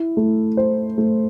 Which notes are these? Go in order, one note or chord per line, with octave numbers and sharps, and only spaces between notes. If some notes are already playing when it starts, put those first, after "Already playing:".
Already playing: E4
A3
C5
A3